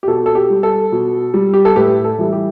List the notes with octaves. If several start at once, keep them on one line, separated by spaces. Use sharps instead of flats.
G4
B2 A4
A4
G4
G3
A4
B2
G3
G4
A4
A2 G4 B4
A4
E3 G3
G4